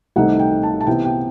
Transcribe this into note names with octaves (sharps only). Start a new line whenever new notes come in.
C2 C3 D#3 A3 D#4 F#5
G5
A5
A5
C3 E3 B3 E4 G5
G5